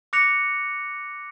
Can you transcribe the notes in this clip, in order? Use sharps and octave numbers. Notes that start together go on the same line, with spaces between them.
D6 F#6 A#6 C#7 F7